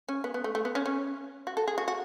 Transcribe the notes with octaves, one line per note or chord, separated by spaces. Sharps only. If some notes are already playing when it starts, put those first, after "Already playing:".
C#4
B3
B3
A3
A3
B3
C#4
C#4
F#4
A4
G#4
F#4
F#4